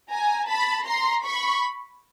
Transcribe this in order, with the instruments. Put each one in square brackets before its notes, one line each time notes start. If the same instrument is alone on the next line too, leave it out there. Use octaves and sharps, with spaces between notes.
[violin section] G#5 A#5
A5 B5
A#5 C6
B5 C#6